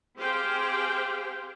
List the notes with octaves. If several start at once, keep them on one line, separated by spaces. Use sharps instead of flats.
C4 G4 G#4 C5 F5 G5